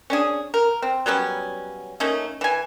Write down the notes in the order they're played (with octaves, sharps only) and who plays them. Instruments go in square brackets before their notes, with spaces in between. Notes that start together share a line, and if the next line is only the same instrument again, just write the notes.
[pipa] C#4 D4 G#4
A#4
C4
F#3 G3 B3 C#4
A3 A#3 C#4 D#4
E3 G#5